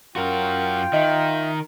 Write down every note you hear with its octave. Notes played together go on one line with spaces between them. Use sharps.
F#2 F4 F#4 A#4 G5
D#3 D#5 E5